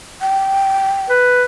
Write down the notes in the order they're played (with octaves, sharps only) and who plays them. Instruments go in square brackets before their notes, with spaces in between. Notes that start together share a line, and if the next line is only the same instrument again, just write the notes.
[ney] G5
[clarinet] B4